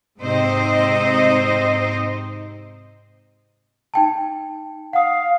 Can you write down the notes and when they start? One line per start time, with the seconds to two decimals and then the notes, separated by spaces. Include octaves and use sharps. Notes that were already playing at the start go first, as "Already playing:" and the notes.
0.19 G#2 C3 C4 D#4 C5 D#5
3.94 D#4 G5 A5
4.93 F5 F#5 D#6